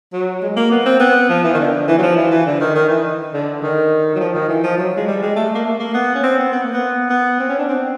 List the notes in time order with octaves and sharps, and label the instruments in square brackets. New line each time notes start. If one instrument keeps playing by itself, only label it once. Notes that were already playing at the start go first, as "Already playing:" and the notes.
[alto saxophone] F#3
G#3
A#3
B3
C4
B3
F3
E3
D#3
D3
E3
F#3
F3
E3
E3
D3
D#3
D#3
E3
D3
D#3
F#3
F3
D#3
E3
F3
F#3
G#3
G3
G#3
A3
A#3
A3
A#3
B3
C#4
C4
B3
B3
A#3
B3
B3
C4
C#4
D4
C4